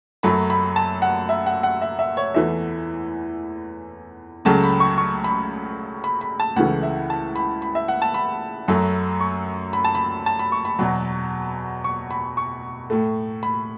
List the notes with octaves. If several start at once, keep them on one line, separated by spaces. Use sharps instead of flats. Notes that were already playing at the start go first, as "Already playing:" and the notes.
F#2 F#3 A3 B5
B5
A5
F#5
E5
F#5
F#5
E5
E5
C#5
E2 E3 A3 E5
C#2 C#3 F#3 A3 A5
B5
C#6
C#6
B5
B5
B5
A5
C#2 C#3 E3 A3 F#5
E5
A5
B5
B5
E5
F#5
A5
B5
F#2 F#3 A3
C#6
B5
A5
B5
A5
B5
C#6
B5
E2 B2 F#3
C#6
B5
C#6
A2 A3
B5